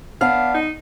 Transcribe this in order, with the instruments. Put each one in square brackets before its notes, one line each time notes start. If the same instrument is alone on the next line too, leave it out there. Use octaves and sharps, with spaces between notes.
[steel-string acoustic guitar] B3 D4 [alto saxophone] F5
[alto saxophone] D#4